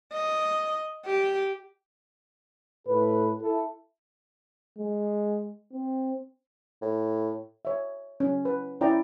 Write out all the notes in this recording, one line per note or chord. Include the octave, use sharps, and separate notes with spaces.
D#5
G4
A2 A4 B4
E4 A4
G#3
C4
A2
C#5 E5
C#4
B4
C#4 E4 D5 G5 A#5